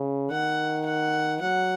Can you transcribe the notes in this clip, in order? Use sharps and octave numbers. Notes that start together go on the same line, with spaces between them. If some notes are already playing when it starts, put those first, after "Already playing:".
Already playing: C#3
D#3 F#5
F#5
F#3 F#5